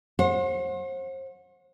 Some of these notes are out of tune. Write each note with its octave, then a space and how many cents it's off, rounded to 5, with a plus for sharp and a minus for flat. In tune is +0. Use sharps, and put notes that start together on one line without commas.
C5 +35 F#5 -35